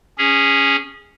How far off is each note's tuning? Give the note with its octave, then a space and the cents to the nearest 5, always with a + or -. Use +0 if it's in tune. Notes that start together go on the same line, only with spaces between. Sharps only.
C#4 +0 G#4 -20